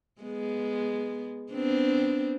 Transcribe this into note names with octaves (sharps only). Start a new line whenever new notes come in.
G#3 B3
B3 C4 D4